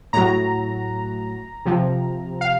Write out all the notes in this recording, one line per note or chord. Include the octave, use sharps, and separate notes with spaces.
A2 F#3 A#5
C3 F3
F5